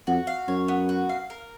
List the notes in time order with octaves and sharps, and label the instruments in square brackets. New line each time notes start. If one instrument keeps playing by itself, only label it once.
[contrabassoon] F2 [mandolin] F#4
[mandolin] F5
[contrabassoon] F#2 [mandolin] C#5
[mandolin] B3
F#4
F5
A#4